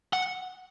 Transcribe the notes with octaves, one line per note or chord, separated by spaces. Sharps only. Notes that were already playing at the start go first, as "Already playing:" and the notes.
F#5